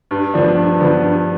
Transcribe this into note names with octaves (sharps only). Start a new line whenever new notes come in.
G2
F3 B3 D4
G2
F3 B3 D4
G2